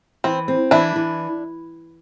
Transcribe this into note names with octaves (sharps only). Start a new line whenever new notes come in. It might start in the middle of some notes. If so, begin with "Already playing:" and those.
E3 C4
C4
E3 D4 E4
E3